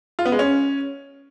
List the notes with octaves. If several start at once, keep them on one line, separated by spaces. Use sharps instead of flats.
F4
B3
G#3
C#4